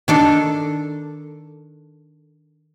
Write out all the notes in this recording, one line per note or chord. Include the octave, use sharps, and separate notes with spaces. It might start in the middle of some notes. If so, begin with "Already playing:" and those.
D#3 D4 A4